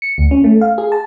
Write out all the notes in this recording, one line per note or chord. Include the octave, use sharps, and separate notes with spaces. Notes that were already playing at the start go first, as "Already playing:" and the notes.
C#7
D2
C#4
A3
F5
G#4
A5